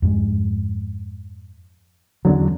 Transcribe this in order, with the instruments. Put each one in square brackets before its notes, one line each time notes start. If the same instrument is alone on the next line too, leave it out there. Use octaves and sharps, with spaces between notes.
[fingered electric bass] F2 G#2 G#3
[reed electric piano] E2 D3 F#3 [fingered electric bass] E3 C#4